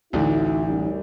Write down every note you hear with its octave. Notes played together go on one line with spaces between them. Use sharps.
A1 D2 A2 D3 D#4 E4 F#4
F#2 G3